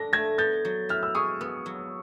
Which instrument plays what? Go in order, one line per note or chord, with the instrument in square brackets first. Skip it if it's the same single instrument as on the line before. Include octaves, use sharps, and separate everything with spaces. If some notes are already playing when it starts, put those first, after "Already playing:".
Already playing: [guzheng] D4 A4 [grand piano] A#6
[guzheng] A3 [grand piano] G#6 A#6
[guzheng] B3 [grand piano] G6 A6
[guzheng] F#3
[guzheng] E4 [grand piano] F6
[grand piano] E6
[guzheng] G#4 [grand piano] C#6 D#6
[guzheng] B3
F#3